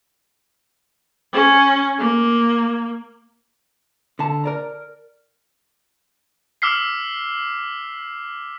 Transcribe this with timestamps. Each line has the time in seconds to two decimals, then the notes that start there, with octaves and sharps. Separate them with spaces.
1.33 C#4
1.99 A#3
4.19 D3 A5
4.44 A#4 D5 A#5
6.62 D6 E6 F6 B6 C7